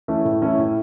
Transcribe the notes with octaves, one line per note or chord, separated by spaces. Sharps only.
E3 A3 C#4 E4
A2
E3 A3 C#4 E4
A2